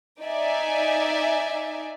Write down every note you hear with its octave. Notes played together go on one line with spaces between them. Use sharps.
D#4 D5 E5 G#5